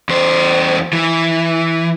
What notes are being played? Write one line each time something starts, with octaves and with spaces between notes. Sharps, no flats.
E2 C5
E3